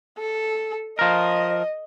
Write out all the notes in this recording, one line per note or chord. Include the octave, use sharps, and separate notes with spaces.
A4
F3 A#4 D#5